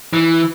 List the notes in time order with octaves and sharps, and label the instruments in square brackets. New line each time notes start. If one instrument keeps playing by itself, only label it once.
[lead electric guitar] E3